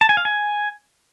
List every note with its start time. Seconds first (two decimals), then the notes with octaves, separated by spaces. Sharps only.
0.01 A5
0.09 G#5
0.17 F5
0.25 G#5